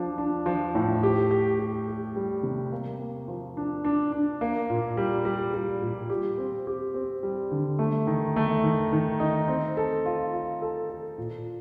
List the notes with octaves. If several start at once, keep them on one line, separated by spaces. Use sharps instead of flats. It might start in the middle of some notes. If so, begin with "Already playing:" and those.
Already playing: F3 D4
D4
F3
A2
G4
G4
G4
G4
G3
C3
A#3
A#3
F3
D4
D4
D4
A#3
A#2
G3
G3
G3
A#2
G4
C4
G4
C4
G3
D3
A3
D#3
A3
D#3
D#3
D#4
C4
A4
F4
F4
A4
A4
A#2